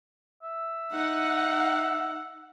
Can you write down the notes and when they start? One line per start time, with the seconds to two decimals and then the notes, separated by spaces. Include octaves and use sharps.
0.42 E5
0.93 D#4 F#5